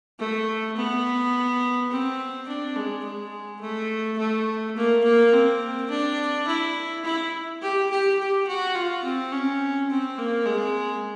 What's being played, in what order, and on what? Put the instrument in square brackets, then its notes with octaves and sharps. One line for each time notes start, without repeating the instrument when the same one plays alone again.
[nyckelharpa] A3
B3
C4
D4
G#3
G#3
A3
A3
A#3
A#3
C4
D4
E4
E4
G4
G4
G4
F#4
F4
C4
C#4
C4
A#3
G#3